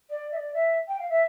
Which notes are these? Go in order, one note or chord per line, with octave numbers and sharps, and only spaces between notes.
D5
E5
D5
E5
G5
F5
E5